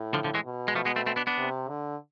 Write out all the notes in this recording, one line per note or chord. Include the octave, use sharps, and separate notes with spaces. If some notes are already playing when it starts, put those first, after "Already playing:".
Already playing: A2
D3 F3
D3 F3
E3 G#3
B2
G#3
F3 A3
G#3 B3
A3 C4
A3 C4
B3 D4
B3 D4
C3
D3